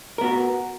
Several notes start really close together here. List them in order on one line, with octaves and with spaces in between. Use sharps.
A#4 B3 F#4